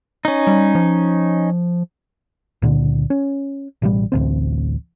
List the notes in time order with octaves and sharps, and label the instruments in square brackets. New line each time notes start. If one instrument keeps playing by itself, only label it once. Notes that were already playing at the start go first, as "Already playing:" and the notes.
[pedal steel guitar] C#4 D#4
[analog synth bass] G3
F3
[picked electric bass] C#2 A#2 D3
C#4
A1 B2 G3
D1 A1 D2 C4